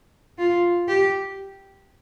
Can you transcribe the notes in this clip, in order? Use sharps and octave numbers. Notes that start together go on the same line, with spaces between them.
F4
G4